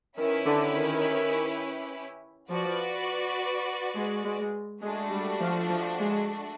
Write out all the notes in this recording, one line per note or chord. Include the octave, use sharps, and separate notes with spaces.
D#3 C#4 E4 G4 B4
D3
D#3
F3 F#4 B4 D5
G#3
G#3
G#3 A3 D4 F#4
G3
F3
F3
G#3